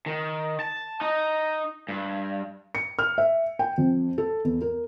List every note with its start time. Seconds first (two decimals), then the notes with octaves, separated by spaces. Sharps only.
0.06 D#3
0.60 A5
1.01 D#4
1.89 G2
2.75 C#7
2.99 F6
3.18 E5
3.59 G5
3.78 F2
4.18 A4
4.44 E2
4.61 A#4